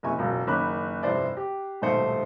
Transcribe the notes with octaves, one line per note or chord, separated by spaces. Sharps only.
F#1 C3 E4 G#5 C#6
E1 C#2 F#2
F#1 D#3 C#4 B5 D6 F#6
F1 G2 E4 C5 D5
G4
D#1 B1 G#2 A3 C5 C#7